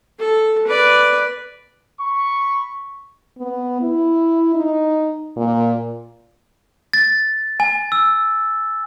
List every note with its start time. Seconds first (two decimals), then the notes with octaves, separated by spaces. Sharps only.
0.19 A4
0.67 B4 D5
1.99 B5 C#6
3.39 B3
3.81 E4
4.55 D#4
5.37 A#2
6.93 A6
7.60 G#5
7.92 E6